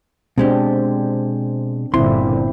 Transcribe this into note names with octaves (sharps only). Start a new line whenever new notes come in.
B2 G#3 C4 D4 G4
G1 A#2 D3 C4 E4 C6